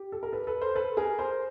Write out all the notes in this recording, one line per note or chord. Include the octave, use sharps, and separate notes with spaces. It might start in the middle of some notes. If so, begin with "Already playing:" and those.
Already playing: G4
A4
A#4
A4 B4
A4 B4
A#4 C5
A4 B4
G#4 A#4
A#4 C5